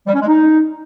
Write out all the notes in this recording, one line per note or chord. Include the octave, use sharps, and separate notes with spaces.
G3
C#4
G#3
D#4